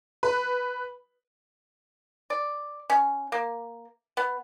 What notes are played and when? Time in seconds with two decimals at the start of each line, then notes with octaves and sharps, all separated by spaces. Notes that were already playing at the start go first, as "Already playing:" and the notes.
0.23 B4
2.30 D5
2.90 C#4
3.32 A#3
4.17 B3